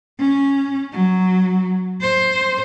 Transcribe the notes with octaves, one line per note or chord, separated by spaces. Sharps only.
C#4
F#3
C5